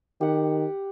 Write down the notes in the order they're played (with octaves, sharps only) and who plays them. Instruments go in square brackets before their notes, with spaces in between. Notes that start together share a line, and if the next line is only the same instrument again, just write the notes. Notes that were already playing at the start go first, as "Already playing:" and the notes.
[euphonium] D#3 [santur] G4 F#5